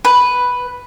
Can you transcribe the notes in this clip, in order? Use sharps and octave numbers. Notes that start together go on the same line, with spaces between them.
B4